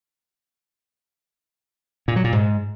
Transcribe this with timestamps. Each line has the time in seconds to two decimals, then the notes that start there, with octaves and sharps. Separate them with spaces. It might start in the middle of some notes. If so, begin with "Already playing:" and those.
2.08 A#2
2.16 F#3
2.24 A#2
2.32 G#2